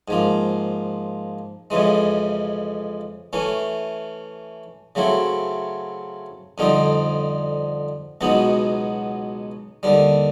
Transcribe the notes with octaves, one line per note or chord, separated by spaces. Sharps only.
G#2 F3 A#3
F2 C#3 E3 G#3
E3 A3 C#4
C#3 F#3 A3 C4 E4
F2 D3 G3 C4 D#4
C#2 B2 F#3 B3 D#4
D#2 D3 G3